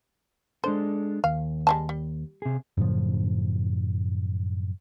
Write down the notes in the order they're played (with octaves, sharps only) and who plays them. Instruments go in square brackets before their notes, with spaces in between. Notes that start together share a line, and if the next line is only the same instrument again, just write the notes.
[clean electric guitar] G#3 D4 A4 [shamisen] C5
[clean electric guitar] D#2 [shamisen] F5
[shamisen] G3 G#3 A5
G3
[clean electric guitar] C3 G#4
[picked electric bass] F#2 A2 C#3 F3